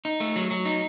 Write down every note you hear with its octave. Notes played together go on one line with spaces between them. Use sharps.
D#4
A3
F#3
F#3
D#4